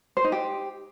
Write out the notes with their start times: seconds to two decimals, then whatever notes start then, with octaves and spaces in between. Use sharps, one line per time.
0.17 C5
0.24 D#4
0.32 G4